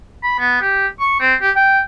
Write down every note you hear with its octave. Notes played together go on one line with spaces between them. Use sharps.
B5
B3
G4
C#6
C4
G4
G5